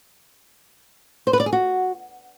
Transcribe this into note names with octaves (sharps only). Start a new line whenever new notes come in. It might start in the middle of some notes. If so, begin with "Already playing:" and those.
C5
B4
D5
G#4
F#4